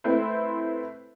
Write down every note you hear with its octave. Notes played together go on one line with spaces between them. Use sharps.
A3 C4 E4 B4 C5